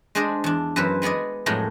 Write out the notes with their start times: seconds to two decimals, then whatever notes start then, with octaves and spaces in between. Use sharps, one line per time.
0.15 G#3 D4 G#4 C5 D5 D#5
0.44 E2 D4
0.76 F#2 E3 F#3 B4 C5
1.02 G#3 B3 G#4 D5 D#5
1.46 F2 A2 F#3 G#3 A3 A#4